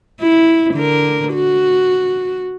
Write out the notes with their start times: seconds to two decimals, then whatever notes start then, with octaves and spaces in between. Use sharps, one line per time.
0.21 E4
0.74 D3 A#4
1.33 F#4